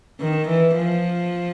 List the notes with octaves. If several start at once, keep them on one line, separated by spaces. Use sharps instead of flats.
D#3
E3
F3